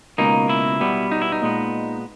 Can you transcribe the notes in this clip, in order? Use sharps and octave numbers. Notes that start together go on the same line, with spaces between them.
C#2 B2 A#3 D#4
E4
B2 G3 B3
D#4
E4
D#4
A#2 G#3 B3